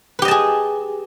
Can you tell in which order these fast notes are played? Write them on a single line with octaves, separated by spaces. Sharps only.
B4 G4 D#5 A5 G#4